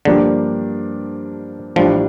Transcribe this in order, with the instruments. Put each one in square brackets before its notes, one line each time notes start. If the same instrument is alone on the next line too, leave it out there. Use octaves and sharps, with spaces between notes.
[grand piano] G2 F3 A#3 D4 G4 [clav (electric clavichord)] D3
[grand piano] A1 A2 G3 D4 [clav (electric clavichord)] F3